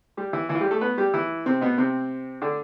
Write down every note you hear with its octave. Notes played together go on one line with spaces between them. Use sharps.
G3 G4
E3 E4
E3 E4
F4
G3 G4
A3 A4
B3 B4
G3 G4
E3 E4
C3 C4
B2 B3
C3 C4
D3 D4